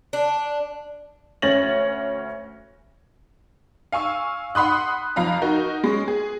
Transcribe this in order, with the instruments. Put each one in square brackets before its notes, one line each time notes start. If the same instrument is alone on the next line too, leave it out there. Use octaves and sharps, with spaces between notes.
[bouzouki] D4
[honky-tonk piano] D2 C#4 C#5 A6 A#6 F#7
F5 G#5 C#6 E6
F#5 B5 C6 D#6 F#6
F2 F3 F5 A#5 B5
D#4 F#4 A#4
G#3 C#4
G#4